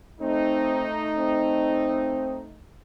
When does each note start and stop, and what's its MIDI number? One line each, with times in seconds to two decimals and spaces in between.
0.21 2.58 57
0.21 0.86 60
0.21 2.58 63
1.18 2.41 60